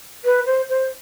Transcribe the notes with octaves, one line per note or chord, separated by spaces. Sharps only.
B4
C5
C5